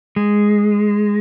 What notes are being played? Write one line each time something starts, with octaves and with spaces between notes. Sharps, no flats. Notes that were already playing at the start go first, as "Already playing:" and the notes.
G#3